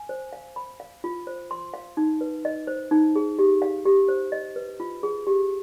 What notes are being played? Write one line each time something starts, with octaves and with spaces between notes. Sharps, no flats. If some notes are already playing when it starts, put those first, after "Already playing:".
Already playing: G#5
C5
F5
B5
F5
F4
C5
C6
F5
D#4
B4
D#5
C5
D#4
G#4
G4
F5
G4
C5
D#5
B4
F4
G#4
G4